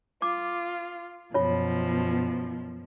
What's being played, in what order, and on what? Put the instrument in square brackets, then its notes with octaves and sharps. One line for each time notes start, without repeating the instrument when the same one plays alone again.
[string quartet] F4 [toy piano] D6
[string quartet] F#2 B2 F3 [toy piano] F4 C#5